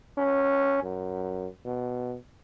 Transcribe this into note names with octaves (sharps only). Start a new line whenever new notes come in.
C#4
F#2
B2